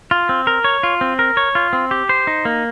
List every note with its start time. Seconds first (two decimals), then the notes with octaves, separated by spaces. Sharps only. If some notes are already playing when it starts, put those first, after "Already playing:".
0.11 F4
0.29 C4
0.47 A#4
0.64 C#5
0.83 F4
1.01 C4
1.19 A#4
1.37 C#5
1.55 F4
1.73 C4
1.91 G4
2.09 C5
2.27 D#4
2.45 A#3